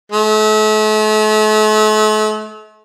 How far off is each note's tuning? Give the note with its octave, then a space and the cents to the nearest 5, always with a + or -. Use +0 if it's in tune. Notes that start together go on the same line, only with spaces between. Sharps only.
A3 -40